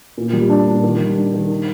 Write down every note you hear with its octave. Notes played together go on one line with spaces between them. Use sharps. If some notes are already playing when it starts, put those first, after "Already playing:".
A#2
G3
D4
A#2
D#3
G3
D4
D#3
D#4